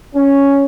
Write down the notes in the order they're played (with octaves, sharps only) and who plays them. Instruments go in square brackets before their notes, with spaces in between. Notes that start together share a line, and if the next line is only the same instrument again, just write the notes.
[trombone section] C#4